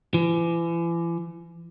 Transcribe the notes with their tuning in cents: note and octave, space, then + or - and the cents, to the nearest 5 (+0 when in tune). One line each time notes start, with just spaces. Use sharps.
E3 +40